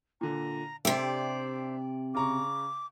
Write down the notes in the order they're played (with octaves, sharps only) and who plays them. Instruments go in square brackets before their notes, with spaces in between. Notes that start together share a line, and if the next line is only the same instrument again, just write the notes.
[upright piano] A#2 D3 [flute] A#5
[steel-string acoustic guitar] C3 D5 [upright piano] D4 G4 E5 [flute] C5
[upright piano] C#3 A#5 C#6 [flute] D6